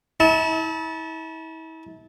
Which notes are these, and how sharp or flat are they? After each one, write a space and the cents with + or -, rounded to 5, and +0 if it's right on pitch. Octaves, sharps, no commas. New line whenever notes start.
E4 -40 A5 -10